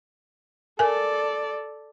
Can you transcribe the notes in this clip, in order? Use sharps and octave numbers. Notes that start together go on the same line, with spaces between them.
A4 A#4 D5 G#5